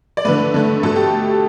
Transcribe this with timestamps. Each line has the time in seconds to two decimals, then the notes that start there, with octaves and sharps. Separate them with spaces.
0.17 D5
0.25 D3 A3 B4
0.54 D3 A3
0.83 B2 A3 A4
0.96 G4